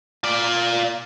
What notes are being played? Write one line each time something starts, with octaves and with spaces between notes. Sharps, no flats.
F4 D5